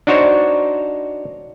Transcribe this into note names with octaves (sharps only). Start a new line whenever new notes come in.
D4 D#4 F#4 C5 C#5